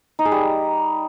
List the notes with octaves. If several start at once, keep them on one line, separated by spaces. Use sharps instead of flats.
D#4
G#4
G3